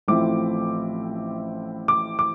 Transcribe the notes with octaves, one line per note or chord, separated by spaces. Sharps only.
A1 A2 F3 C4 E4 D6
D6
D6